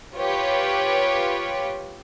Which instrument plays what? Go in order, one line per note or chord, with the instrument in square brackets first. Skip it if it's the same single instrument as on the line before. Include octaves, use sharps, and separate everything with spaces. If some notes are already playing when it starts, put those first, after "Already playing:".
[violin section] F4 G4 B4 C#5